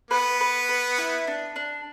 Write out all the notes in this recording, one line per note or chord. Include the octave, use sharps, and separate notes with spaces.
B3 B4
B4
B4
E4
D4
D4